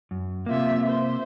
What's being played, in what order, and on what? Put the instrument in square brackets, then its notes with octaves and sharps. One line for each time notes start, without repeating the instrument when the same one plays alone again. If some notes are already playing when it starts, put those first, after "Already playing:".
[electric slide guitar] F#2
[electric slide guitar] C3 A#3 [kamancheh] F4 E5
[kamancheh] C5 E5